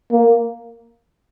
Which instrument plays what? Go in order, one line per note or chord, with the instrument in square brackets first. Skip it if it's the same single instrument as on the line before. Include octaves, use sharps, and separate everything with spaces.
[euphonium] A#3